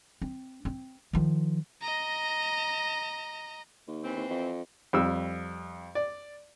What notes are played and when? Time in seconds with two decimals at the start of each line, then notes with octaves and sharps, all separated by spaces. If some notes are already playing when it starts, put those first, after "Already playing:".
0.22 C4
0.65 C4
1.13 D#3 F3
1.81 D#5 A#5
3.87 D#2
4.04 E3 C4
4.16 D#2
4.30 F2
4.93 F2 G3 E6
5.95 D5